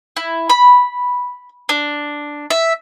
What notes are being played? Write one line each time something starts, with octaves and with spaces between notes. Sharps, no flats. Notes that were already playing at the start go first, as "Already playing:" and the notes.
E4
B5
D4
E5